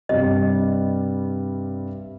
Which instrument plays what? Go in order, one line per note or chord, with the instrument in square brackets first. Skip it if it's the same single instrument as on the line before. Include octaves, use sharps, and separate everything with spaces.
[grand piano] G2 C3 G3 [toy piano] D#5